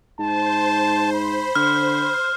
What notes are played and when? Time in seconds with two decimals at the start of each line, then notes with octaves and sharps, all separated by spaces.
0.19 G#2 C5 A5
1.13 B5
1.55 D3 F6